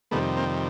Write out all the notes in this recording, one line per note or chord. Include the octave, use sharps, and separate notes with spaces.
F2 C3 D#3 G3 A3 B3
A#3 C4